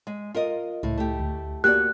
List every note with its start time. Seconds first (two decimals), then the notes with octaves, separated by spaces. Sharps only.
0.07 G#3
0.34 F4 A#4 D#5
0.83 C#2 A2 E4
0.98 A3 G4
1.20 D2
1.64 A#3 B3 F#4 G4 D5 F#6